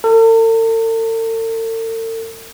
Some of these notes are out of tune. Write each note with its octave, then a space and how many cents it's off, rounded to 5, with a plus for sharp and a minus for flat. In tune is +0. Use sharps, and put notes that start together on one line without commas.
A4 +45